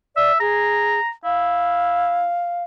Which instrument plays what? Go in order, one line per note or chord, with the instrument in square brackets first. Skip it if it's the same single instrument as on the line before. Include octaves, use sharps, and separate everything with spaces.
[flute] D5 [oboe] E5
[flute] G#4 [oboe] A#5
[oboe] E4 [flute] F5